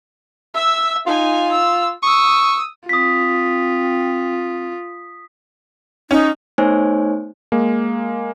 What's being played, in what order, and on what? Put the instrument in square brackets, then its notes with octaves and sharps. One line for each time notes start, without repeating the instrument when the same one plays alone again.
[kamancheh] E5 E6
[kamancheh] D#4 G#5 [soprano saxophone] F4
[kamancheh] E6
[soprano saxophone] C#6 [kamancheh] D#6 E6
[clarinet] C4 [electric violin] F4 [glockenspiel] D#6 B6
[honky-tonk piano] C#4 [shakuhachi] D#4
[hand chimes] A3 B3 D#4 C5 C#5 G#5
[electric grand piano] G#3 A#3